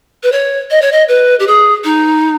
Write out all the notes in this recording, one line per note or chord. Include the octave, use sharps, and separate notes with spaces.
B4
C#5
D#5
C#5
D#5
B4
G4
G#4
D#4